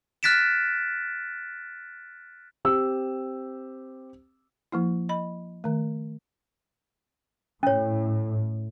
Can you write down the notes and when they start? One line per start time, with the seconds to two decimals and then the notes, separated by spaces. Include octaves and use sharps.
0.23 F6 F#6 A6 B6 D7 E7
2.65 C4 G4 E6
4.72 F3 A#3 E4
5.09 D#5 B5
5.64 D#3 A3
7.63 A2 C#4 C#5